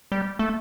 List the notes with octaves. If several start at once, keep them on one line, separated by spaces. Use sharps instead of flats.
G3
A3